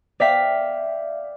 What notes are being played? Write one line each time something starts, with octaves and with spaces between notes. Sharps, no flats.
D5 E5 F5 G5 B6